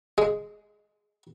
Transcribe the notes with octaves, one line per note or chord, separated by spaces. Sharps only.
G#3